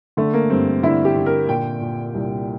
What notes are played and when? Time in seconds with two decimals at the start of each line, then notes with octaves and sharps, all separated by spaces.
0.17 D3 A3
0.34 A#3
0.50 G2 C4
0.83 D3 E4
1.05 G4
1.16 D3
1.26 A#4
1.48 A#2 G5
1.81 A#2
2.14 C2